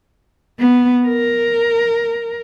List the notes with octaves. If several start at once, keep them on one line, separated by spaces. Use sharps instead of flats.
B3
A#4